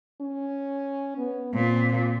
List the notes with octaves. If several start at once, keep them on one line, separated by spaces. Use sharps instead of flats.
C#4
B3
A#2 C4